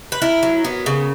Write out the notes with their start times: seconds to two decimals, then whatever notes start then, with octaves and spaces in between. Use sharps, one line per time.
0.12 B4
0.22 E4 A#4
0.43 F#3
0.64 B3
0.86 C#3